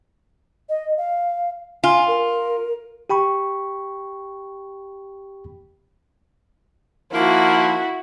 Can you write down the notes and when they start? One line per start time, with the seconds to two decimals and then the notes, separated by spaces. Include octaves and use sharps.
0.69 D#5
0.97 F5
1.84 F4 G#5
2.08 A#4
3.10 G4 G5 B5 C#6
7.12 D#3 F3 A#3 E4 F#4